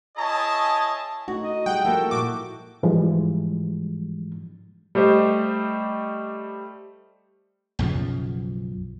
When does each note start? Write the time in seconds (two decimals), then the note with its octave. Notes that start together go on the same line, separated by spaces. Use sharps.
0.17 E4 G#4 C#5 D#5 G#5 A5
1.28 A3 D#4 F#4
1.44 D#5
1.66 G3 G#4 F#5 G5
1.85 F3 A#3 E4 F#4 A4
2.11 A#2 G3 F#4 D6
2.83 G#2 E3 F3 G3 G#3
4.95 G3 A3 G4 C5 D#5
7.79 B1 F#2 C#3 F3